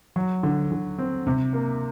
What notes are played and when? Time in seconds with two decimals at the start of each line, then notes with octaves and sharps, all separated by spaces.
0.16 F#3
0.43 D3
0.72 D3
0.98 C4
1.27 C3
1.53 A#3